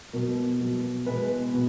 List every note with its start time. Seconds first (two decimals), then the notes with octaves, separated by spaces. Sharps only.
0.13 B2 F#3 A#4
0.60 B2 F#3
1.06 B2 G#3 B4
1.54 B2